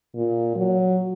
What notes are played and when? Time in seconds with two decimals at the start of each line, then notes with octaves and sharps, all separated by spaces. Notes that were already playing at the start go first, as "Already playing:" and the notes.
0.15 A#2
0.56 F#3